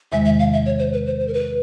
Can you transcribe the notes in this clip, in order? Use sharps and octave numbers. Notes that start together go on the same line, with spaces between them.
E2 C3 D#3 G#3 E5
E5
F5
E5
C#5
C5
B4
C5
C5
A#4
B4